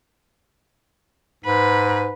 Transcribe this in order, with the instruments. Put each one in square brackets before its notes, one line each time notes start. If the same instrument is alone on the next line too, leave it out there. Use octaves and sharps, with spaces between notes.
[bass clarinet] G#2 [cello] B4